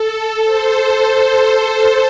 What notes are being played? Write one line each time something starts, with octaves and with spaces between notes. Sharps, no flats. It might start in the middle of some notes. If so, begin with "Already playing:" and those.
Already playing: A4
A4
C5
A4